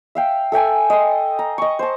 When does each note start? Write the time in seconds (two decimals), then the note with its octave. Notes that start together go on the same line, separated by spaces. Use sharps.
0.15 E5 F5 G5
0.52 A4 E5 G5 G#5
0.90 D#5 C6
1.39 A#5
1.58 D#5 C#6
1.79 C5 A5